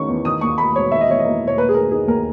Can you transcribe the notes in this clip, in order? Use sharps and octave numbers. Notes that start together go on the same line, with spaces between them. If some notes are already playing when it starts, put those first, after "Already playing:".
Already playing: D#3 G#3 C#4 C#6
E2
D#3 D#6
D#2 C#6
A#3 B5
E1 C#5
D#3 E5
D#5
E2 C#5
D#5
A#3
E1
C#5
A#3 B4
G#4
D#3 A#4
D#4 G#4
D#2 A#4